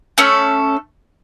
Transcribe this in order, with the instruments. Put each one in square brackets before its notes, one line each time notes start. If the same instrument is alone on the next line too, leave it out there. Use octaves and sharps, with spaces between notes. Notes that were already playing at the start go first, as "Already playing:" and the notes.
[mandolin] A3 C#4 A4